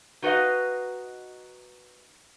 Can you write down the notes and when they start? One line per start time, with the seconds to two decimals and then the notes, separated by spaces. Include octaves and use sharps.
0.22 D#4 F#4 B4 D5 D#5 F5